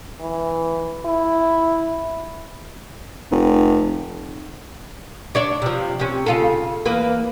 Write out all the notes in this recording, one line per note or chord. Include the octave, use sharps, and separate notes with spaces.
E3
E4
F1
D4 C#5 D5
C3 F3
C3 C#4
C#3 F4 A4
E2 A#3 B4